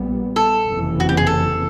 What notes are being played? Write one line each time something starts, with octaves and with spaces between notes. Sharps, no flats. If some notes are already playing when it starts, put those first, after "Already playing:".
Already playing: A#1 A#2 G3 B3
A4
F#1 F2 C3 E3
F#4
G4
G#4
A4